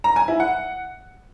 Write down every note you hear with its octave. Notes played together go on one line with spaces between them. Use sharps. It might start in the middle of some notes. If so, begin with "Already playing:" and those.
A#5
G#5
E4
F#5